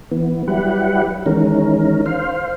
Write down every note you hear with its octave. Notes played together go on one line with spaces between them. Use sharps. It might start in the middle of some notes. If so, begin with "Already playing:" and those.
E3 B3
F#3 G3 E4 G4 B4 F#5
D#3 E3 G#3 C#4 A#4
C5 F5